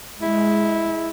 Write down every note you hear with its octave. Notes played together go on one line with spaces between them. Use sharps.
G#3 E4